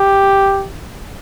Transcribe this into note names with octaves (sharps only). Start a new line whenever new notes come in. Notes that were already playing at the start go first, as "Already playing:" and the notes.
Already playing: G4